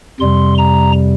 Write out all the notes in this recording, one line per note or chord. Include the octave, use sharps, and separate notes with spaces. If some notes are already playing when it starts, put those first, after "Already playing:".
F2 C3 G3 C6
A#5